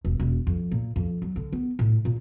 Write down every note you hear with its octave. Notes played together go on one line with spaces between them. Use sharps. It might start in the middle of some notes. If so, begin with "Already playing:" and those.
E1
E1
F2
A#2
F2
F#3
D3
B3
A2
A#2